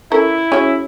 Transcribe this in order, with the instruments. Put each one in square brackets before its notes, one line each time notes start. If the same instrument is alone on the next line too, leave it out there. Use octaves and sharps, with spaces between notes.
[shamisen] C#4 A4 A#4 [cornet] E4
[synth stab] C#4 [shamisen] F#4 G#4